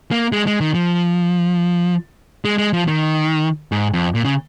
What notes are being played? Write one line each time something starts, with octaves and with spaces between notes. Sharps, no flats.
A#3
G#3
G#3
D#3
F3
G#3
G#3
F3
D#3
G#2
F2
A#2
C#3